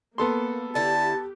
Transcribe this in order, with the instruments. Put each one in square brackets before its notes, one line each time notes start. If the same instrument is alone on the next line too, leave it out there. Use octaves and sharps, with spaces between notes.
[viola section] A#3 [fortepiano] B3 A4 C6
[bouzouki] D3 E4 [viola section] G4 [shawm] A5